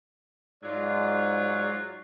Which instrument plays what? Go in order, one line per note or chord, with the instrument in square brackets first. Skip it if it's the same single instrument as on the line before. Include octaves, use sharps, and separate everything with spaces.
[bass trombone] G#2 [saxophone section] F#3 F4 [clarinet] D5